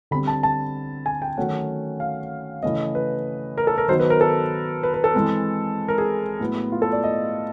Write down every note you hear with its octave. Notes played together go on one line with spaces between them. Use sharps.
D3 G3 C4 B5
A5
A5
G#5
G5
D#3 F#3 A3 C#4 F#5
F5
C#3 E3 A3 C#4 D#5
B4
A#4
A4
A#4
D#3 F#3 B3 D#4 C5
B4
A#4
A4
B4
B4
A4
E3 G#3 C4
A#4
G#4
A2 F#3 B3
F4
A4
D5
D#5